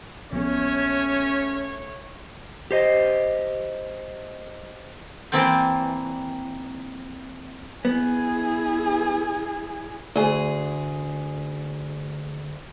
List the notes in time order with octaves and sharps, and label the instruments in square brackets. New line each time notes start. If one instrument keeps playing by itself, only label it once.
[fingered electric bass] A#1 B3 [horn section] A3 C#5 [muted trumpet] C#4
[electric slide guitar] G4 C5 D#5
[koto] E3 A#3 C4 D5 G5
[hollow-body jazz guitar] B3 [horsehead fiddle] E4 G#4
[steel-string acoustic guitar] D2 G#4